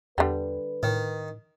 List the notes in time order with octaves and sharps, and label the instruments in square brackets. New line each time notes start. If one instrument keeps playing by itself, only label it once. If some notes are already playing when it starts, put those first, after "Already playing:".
[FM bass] E2 [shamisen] D3 G3 [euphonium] B4
[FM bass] A2 [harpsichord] D#3